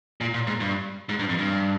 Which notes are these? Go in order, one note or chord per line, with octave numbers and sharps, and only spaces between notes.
A#2
A#2
G#2
G2
G#2
G2
F2
G2